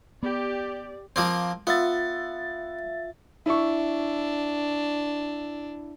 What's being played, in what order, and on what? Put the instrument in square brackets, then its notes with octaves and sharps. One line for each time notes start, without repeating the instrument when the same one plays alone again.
[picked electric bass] B3 [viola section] G4 [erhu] D5
[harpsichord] F3 A#3 C4
[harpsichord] B3 [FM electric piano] F4 E5 A6
[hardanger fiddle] D4 [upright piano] E4 C#6